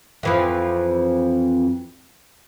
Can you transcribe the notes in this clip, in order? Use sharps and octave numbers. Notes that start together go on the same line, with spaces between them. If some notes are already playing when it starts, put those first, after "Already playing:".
F2 E3 F3